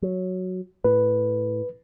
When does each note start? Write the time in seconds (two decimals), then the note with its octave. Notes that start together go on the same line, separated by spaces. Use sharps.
0.02 F#3
0.84 A2 B4